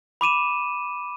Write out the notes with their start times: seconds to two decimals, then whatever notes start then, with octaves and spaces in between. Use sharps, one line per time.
0.21 B5 D6 D#7 E7